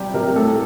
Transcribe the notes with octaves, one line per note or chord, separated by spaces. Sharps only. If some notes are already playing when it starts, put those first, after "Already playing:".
Already playing: C3 G3 G4
C3 A#4
A2 A4